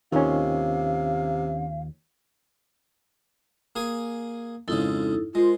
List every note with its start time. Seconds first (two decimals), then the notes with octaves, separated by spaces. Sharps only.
0.12 D#2 C3 D#3 C#4 F4 F5
3.76 A#3 G#4 G#5
4.68 F2 G#2 C#3 D#4 E4 A4
5.35 G#3 F4 A#4 C5